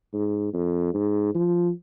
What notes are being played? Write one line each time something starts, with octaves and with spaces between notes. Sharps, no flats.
G#2
F2
G#2
F3